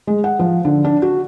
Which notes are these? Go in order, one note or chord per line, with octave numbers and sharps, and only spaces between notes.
G#3
F#5
F3
D3
D4
F#4